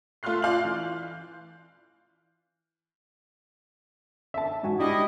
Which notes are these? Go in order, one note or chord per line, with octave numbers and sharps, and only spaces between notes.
A3 F4 C6 F6 F#6 C7
F4 D5 F5 G6 F#7
E3
E5 A5
G#2 F#4 G#5
G3 D4 E4 G4 D#5